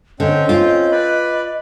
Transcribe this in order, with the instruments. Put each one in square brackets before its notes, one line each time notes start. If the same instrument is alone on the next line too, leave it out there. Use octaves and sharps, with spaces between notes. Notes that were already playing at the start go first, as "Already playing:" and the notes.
[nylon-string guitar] D3 [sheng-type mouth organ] C4 C#4 G5 [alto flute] D#5
[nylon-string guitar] F4
[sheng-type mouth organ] B4 D5 B5